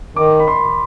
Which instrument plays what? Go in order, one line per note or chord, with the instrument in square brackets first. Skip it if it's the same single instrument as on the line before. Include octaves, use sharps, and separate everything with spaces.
[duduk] D#3 [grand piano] D6
[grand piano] B5
C6